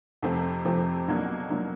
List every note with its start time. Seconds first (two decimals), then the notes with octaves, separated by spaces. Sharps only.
0.22 F2 C3 F3 A3 C4
0.65 F2 C3 F3 A3 C4
1.08 B2 F#3 A#3 D4
1.50 B2 F#3 A#3 D4